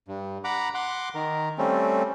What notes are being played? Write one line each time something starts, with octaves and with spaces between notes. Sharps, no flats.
G2
F#5 A#5 B5 D6
F#5 C6 D6
D#3 A#4
G3 A3 C4 C#4